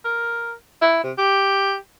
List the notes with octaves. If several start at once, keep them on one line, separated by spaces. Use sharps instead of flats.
A#4
E4
C3
G4